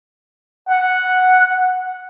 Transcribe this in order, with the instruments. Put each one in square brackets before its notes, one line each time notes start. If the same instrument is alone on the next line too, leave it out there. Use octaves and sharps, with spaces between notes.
[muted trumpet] F#5